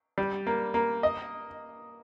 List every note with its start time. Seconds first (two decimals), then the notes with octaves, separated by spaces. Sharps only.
0.18 G3
0.47 A#3
0.74 A#3
1.03 D#5